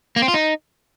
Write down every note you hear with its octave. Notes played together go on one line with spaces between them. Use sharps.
A#3
C4
F4
D#4